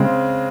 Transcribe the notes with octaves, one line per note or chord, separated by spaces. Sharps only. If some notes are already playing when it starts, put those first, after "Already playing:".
Already playing: C#3 G#3 C4